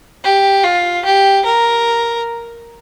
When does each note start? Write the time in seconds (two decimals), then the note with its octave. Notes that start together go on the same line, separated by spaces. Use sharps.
0.24 G4
0.64 F4
1.05 G4
1.45 A#4